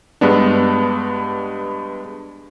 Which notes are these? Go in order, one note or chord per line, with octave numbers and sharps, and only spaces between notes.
G2 G#3 B3 D4